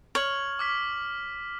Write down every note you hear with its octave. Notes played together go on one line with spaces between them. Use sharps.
C#5 F6 F#7
D6 F6 B6